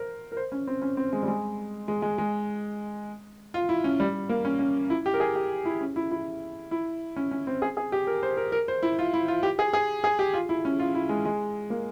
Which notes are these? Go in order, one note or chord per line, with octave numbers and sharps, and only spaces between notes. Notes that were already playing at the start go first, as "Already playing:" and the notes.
Already playing: A#4 C5
A#4
C5
C#4
C4
C#4
C4
G#3
G3
G#3
G#3
G#3
G#3
F4
E4
C#4
G3
A#3
C#4
C#4
E4
G4
A#4
G#4
G4
E4
C#4
E4
E4
E4
C#4
C#4
C4
G#4
G#4
G4
A#4
C5
A#4
A#4
C5
E4
F4
E4
F4
G4
G#4
G#4
G#4
G4
F4
E4
C#4
F4
E4
G#3
G#3
A#3